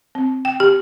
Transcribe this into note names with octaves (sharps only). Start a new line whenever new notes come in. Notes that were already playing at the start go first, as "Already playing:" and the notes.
C4
G5
G4